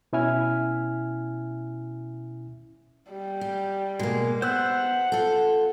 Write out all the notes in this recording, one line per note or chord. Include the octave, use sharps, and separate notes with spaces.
B2 C#4 E4 E5 G#5 F6
G3
G4
B2 G#3 A#3
B3 C5 F#5 E6 F#6
F4 A4